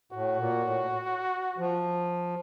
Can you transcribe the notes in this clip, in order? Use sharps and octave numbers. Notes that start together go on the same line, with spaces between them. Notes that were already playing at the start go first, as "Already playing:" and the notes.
A2 F#4
A#2
A2
F3